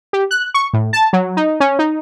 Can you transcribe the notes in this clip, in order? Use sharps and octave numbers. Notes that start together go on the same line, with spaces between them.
G4
F#6
C#6
A2
A5
F#3
D#4
C#4
D#4